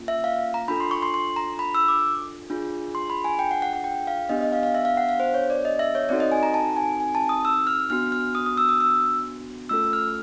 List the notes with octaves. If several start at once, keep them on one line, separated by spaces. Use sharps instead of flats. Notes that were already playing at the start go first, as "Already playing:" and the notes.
Already playing: A#3 C#4 F4
E5
F5
A#5
D4 F4 A4 B5
C6
C#6
C6
C6
A#5
B5
E6
D6
D4 F4 G#4
C6
B5
G#5
G5
F#5
F#5
F#5
G5
F5
B3 D4 G4 D#5
D#5
F5
F5
E5
F5
F#5
F5
C5
C#5
D5
D#5
E5
C#5
C4 D#4 F#4 A4 D5
D#5
G#5
A#5
A5
G#5
G#5
A5
D#6
E6
F6
B3 D4 F#4 F6
F6
D#6
D#6
E6
D#6
E6
A3 C#4 F4 A4 E6
F6